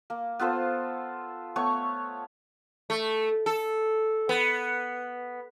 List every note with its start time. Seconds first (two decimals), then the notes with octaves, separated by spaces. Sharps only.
0.10 A#3
0.39 B3 F4 A4 C5
1.56 A3 B3 C#5 C#6
2.90 A3
3.46 A4
4.29 B3